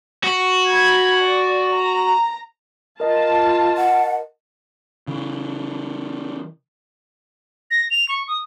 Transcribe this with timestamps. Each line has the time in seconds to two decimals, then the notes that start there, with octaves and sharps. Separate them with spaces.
0.24 F#4
0.69 B5 G#6
1.22 D5
1.71 A#5
3.00 F4 A#4 D#5 A5
3.77 F#5
5.08 C#3 E3
7.71 A#6
7.90 F7
8.09 C#6
8.28 D#6